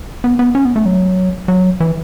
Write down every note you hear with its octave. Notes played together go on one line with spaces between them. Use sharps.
B3
B3
C#4
B3
A3
F#3
F#3
E3